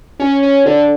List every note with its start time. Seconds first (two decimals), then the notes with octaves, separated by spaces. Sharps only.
0.20 C#4
0.43 C#4
0.66 D3